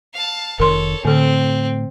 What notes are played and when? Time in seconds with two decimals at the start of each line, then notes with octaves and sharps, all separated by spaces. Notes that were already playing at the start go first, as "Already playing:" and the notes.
0.14 F5 A5
0.60 F1 D#3 A4 A#4 C#5 C6
1.05 A2 D3 C4 A4